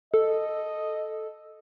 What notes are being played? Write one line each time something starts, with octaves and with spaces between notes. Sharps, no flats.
A4 D#5